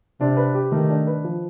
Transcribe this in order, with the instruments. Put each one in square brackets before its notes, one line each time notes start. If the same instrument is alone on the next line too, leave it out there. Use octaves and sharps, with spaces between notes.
[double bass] C3 [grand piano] D4
[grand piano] B4
G4
[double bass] D#3 [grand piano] A3
[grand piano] D4
B4
F3